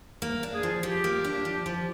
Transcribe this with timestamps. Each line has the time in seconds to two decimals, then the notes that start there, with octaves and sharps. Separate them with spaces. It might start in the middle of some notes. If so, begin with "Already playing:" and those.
0.22 A#3
0.43 D4
0.53 G#4
0.63 F3
0.83 F3 G4
1.04 A#3
1.24 D4
1.45 F3
1.66 F3